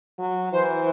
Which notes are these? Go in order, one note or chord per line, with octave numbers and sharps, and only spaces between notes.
F#3
E3 C5